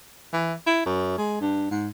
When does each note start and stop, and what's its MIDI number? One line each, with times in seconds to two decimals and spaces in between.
0.33 0.53 52
0.67 0.81 64
0.86 1.15 42
1.18 1.41 56
1.41 1.69 43
1.71 1.88 44